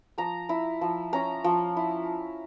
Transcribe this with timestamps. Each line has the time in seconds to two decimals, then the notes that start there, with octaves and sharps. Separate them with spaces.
0.18 F3 A#5
0.49 E4
0.81 F3
1.13 C#4 A#5
1.44 F3
1.77 E4